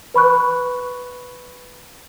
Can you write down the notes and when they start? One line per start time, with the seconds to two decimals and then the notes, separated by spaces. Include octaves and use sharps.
0.14 B4 B5 C#6 F#6